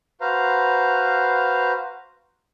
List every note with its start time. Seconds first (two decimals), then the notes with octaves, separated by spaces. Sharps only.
0.21 F#4 B4 C5 F5 A#5